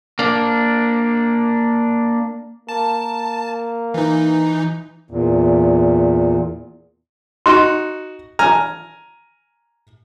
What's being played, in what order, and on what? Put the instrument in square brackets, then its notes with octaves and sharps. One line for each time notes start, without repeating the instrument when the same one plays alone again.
[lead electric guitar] A#3 D4
[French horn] A#3 [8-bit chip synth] A5
[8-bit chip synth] E3 D#4
[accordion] E2 A#2
[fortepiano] D#4 F#4 [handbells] C6
[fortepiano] G#5 A#5 F6